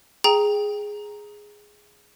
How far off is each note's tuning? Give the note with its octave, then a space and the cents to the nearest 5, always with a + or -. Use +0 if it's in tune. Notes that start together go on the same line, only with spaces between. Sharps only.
G#4 +0 G5 +5 A#5 +0